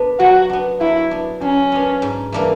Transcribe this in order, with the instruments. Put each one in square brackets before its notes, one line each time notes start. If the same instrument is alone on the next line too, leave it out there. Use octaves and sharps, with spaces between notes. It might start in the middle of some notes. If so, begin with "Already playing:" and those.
Already playing: [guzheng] B3 D4
[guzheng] F#3 [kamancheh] F#4
[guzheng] B3 D4
[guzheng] F#3 [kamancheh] E4
[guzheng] B3 D4
[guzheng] F#3 [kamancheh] C#4
[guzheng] B3 D4
G#2
E3 G3 A#3 D4